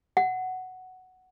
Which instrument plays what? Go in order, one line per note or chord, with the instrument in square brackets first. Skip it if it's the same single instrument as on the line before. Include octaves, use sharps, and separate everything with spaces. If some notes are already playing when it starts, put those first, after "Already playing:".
[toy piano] F#5